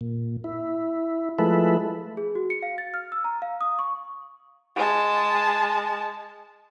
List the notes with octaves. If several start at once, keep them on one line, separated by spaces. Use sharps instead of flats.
A#2
E4
F3 G#3 A3 E4 A4 B4
G#4
F#4
C#7
F5
A6
F6
E6
A#5
F5
D#6
C#6
G#3 A5